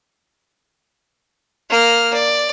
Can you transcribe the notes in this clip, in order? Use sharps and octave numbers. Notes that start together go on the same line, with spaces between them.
A#3 F6
D5